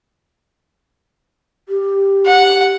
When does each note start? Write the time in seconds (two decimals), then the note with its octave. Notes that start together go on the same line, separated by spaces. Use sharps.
1.69 G4
2.26 F#5